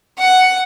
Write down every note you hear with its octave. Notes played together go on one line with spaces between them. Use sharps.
F#5